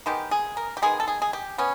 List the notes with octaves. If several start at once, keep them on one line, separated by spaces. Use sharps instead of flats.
D#3 G#3 B3 G4
G#4
A#4
G4
D#3 G#3 B3 G#4
A4
G#4
G#4
G4
B3 C#4